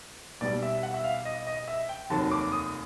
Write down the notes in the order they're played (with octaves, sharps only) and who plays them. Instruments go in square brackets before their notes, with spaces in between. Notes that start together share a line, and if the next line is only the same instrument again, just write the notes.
[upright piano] B1 B2 G3 [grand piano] D5
[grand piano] E5
F#5
E5
F5
D#5
D#5
E5
G5
[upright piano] F1 D#2 D#3 F#3 [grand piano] A5
[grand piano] D6
D#6